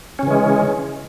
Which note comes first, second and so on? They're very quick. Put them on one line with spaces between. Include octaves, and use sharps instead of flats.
C#4 C#3 E3 G#3